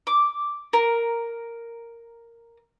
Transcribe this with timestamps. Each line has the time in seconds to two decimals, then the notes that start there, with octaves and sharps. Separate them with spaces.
0.07 D6
0.73 A#4